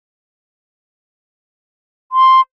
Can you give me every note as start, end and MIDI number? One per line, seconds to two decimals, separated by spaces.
2.12 2.40 84